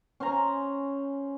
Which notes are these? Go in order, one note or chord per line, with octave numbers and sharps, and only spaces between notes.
C#4 C5 G#5 A#5